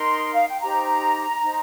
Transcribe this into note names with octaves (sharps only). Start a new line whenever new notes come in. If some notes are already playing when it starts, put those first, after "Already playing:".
Already playing: D#4 A#4 C6
F5
G5
D#4 G4 C5 A#5
D#4 C5